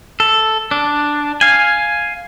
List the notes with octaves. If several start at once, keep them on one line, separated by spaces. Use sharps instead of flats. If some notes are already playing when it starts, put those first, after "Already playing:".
A4
D4
F5 G#5